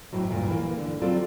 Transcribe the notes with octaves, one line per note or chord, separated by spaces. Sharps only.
F2 A2 F#3
D2 G2 A#2
E3 A#3
D3
F#3 C4 F4 A4 D5